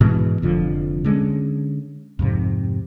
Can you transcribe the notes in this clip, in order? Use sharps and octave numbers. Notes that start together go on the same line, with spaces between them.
G#2 B2 E3 G#3
F1 F2 D3 F3
D3 G#3 A3 C#4
F2 G#2 C3